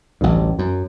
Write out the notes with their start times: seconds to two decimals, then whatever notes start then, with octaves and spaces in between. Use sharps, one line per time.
0.21 A1 D2 G2
0.59 F#2